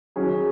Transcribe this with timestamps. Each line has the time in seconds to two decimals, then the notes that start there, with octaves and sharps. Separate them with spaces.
0.16 D#3 F#3 C#4 G#4